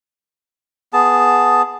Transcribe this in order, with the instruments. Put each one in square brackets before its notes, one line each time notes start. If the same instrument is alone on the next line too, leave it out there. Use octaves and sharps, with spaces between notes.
[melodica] B3 G#4 A5